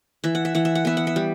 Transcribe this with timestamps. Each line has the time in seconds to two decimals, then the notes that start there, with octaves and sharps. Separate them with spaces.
0.24 E3 E5
0.35 F#5
0.45 E5
0.55 E3 F#5
0.65 E5
0.75 F#5
0.85 B3 E5
0.97 F#5
1.07 E5
1.16 G3